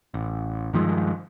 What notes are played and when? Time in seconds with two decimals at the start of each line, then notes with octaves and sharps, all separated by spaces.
0.14 A1
0.73 G2 D#3 F3 G#3